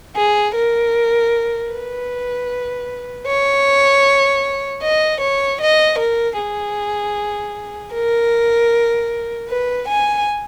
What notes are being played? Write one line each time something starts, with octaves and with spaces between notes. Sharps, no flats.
G#4
A#4
B4
C#5
D#5
C#5
D#5
A#4
G#4
A#4
B4
G#5